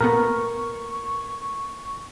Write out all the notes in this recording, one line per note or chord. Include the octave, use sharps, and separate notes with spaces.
A#2 A3 B3 A#4 C#6